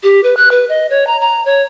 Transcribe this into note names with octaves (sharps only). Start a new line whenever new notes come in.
G4
B4
F#6
B4
D#5
C#5
A#5
A#5
C#5